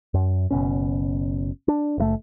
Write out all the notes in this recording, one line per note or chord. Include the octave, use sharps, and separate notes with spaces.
F#2
F#1 B1 B2 C#4
D4
F#1 C#3 A3